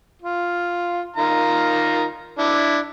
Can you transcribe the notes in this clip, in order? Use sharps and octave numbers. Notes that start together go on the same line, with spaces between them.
F4
D#3 F4 A#5
D4 E4